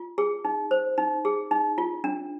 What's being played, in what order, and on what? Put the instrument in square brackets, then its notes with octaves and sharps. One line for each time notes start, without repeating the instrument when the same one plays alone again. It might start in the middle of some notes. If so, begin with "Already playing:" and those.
Already playing: [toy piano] F4
G#4
D#4
C5
D#4
G#4
D#4
F4
D4